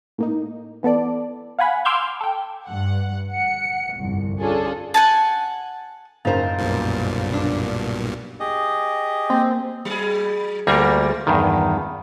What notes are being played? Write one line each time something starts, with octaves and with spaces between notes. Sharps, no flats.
A2 A#3 D#4
E3 B3 A4 D5
F5 F#5 G#5 B5
C6 D6 E6 F6 G6 G#6
A4 G5
G2 F#5
F#5 C#7
G1 C2 F2
C#4 D4 F4 G#4 A4
F#5 G#5 A5
F#1 C#3 D#4 A#4 C5 F5 A6
B1 G2 A#2
D4
G4 G#4 D#5
A#3 C4
F#3 G#4
D2 G3 G#3 A#3 F4 A#4
E2 G2 D#3